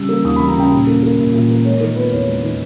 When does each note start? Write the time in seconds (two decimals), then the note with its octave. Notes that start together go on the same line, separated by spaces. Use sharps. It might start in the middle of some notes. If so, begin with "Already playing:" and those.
Already playing: C#3 G3 E6
0.09 A#3
0.24 D#2 D#6
0.36 B5
0.40 G3
0.48 A#5
0.56 C#3 G5
0.72 A#2
0.87 A#3
1.03 A#3
1.19 A#2
1.34 A#2
1.50 A#3
1.65 G#3 C#5
1.80 D#3 A#4
1.96 B3 B4
2.12 E2 C#5
2.27 G#3
2.43 D#3